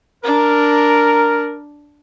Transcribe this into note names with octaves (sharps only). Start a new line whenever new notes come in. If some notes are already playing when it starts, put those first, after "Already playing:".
D4 A#4